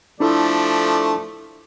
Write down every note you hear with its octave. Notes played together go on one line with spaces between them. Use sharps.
F3 A3 D4 E4 A4 D5